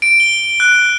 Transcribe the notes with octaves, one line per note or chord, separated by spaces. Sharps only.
D7
G7
F#6